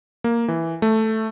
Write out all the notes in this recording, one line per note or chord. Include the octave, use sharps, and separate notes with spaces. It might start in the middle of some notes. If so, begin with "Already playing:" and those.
A#3
E3
A3